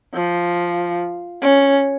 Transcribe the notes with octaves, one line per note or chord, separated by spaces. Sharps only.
F3
C#4